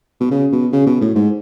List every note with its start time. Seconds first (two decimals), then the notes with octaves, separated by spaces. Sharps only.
0.21 B2
0.31 C#3
0.52 B2
0.73 C#3
0.87 B2
1.01 A2
1.15 G#2